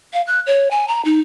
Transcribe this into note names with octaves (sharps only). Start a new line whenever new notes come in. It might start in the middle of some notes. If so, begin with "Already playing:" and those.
F5
F#6
C#5
G#5
A#5
D#4